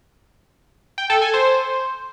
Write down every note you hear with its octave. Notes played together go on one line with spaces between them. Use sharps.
G5
A4
G#5
C5